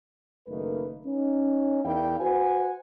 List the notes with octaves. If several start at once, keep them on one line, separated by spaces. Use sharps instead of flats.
F#1 D#3 A3 A#3 B4
C#4 D#4
E2 E4 A#4 D5 F5 G5
F#4 B4 C5 F#5 G#5